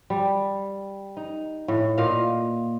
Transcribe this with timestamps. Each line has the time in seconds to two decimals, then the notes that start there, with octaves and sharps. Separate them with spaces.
0.10 G3
1.17 D#4
1.68 A2
1.98 A#2 D#5 F5